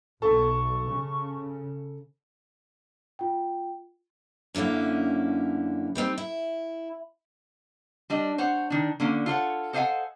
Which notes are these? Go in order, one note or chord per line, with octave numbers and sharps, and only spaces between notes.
B1 A4 C#6
C#3
F4 G5
F#2 D3 A#3 C#4 E4
G3 B3 C4 D#4
E4
G3 D4 D#5
C5 C#5 F#5
D#3 D4
D3 A#3 C#4
F4 A4 C#5 F#5
A4 C5 D#5 F5 F#5 G#5